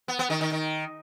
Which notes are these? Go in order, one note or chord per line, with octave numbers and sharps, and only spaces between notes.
B3
B3
D#3
D#3
D#3